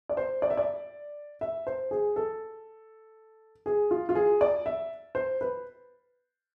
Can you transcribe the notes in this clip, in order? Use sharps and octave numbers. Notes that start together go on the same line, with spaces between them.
D5
C5
D5
E5
D5
E5
C5
G#4
A4
G#4
F4
F4
G#4
D5
E5
C5
B4